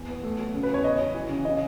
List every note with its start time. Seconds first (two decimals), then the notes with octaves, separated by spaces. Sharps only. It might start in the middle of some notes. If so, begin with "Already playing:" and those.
Already playing: E2
0.09 B3
0.23 A3
0.38 F#3
0.54 C#3
0.63 B4
0.69 E2 C#5
0.84 E2 D#5
1.00 F#3
1.15 E3
1.29 C#3
1.45 C#3 D#5